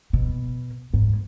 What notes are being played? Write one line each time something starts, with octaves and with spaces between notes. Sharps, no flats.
B2
G#2